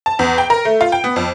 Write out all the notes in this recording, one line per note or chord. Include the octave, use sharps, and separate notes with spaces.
A5
E2
G5
A#4
A3
F4
G5
B3
F2